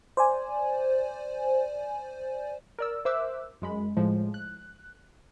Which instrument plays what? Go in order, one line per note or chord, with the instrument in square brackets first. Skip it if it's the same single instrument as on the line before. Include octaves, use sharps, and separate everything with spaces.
[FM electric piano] C5 D5 G#5
[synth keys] A#4 D5 E6
A#4 C5 E5 D6 E6 F#6
F#2 G#3 B5
A2 F3 G#3
F#6